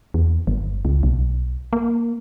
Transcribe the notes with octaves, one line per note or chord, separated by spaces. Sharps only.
E2
G1
C#2
B1
A#3